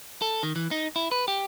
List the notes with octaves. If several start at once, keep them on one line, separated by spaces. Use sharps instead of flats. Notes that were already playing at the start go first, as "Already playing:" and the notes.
A4
D#3
E3
D#4
E4
B4
G4